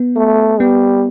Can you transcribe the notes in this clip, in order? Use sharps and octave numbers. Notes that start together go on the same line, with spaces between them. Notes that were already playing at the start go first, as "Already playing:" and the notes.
Already playing: B3
A3
G3 B3